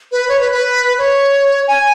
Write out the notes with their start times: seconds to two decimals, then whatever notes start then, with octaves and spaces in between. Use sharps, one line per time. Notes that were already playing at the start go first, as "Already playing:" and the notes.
0.12 B4
0.29 C#5
0.41 B4
0.52 B4
0.98 C#5
1.68 G#5